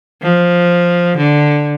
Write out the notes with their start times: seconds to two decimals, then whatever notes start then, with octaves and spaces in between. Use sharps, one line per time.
0.22 F3
1.17 D3